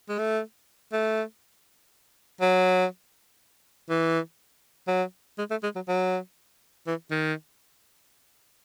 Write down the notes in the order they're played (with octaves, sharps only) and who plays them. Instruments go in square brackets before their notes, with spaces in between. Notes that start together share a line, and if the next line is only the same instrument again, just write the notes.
[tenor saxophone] G#3
A3
A3
F#3
E3
F#3
G#3
A3
G#3
F#3
F#3
E3
D#3